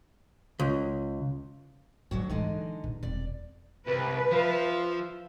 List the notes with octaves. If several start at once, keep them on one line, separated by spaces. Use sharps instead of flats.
C#2
D2 G#2 F#3 F#4
D3 E3 F#3 G#3 D#4
B2
E1 C4 D5
C2 A#4 B4
F3 E5 F5